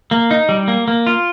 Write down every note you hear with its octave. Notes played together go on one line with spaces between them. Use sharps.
A#3
D#4
G3
A#3
A#3
F4